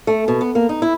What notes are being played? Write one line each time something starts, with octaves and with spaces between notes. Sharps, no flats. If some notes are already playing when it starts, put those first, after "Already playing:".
A3
B2
B3
A#3
D#4
E4